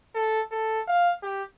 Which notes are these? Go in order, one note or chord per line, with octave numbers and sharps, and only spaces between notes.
A4
A4
F5
G4